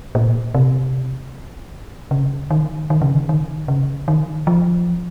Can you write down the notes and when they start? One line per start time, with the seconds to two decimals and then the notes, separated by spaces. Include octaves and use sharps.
0.15 A#2
0.54 C3
2.11 C#3
2.51 D#3
2.90 D#3
3.02 C#3
3.13 D#3
3.29 D#3
3.68 C#3
4.08 D#3
4.47 F3